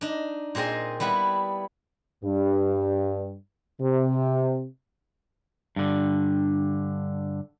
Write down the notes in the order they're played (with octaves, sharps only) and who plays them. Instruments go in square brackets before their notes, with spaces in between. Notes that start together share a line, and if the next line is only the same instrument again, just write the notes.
[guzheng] D4 D#4
A#2 C4 G#4 C5 D#5
G3 B3 E4 B4
[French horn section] G2
C3
[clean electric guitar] G2 D3